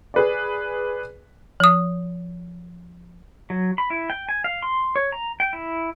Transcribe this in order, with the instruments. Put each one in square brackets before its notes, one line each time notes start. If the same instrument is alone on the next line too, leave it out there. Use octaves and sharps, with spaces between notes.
[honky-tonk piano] G#4 B4 D5
[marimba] F3 D#6
[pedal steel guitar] F#3
B5
E4
G5
G#5
F5
C6
C#5
A#5
G5
E4